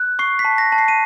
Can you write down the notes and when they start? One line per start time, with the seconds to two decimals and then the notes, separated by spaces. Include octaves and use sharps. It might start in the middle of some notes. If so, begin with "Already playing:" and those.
Already playing: F#6
0.19 C#6 C7
0.39 B6
0.45 A5
0.58 A#6
0.72 A5
0.78 C7
0.88 D#7